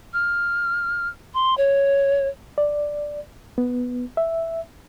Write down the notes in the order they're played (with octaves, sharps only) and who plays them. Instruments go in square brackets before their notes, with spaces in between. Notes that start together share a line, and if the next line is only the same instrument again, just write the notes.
[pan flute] F6
C6
C#5
[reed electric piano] D5
B3
E5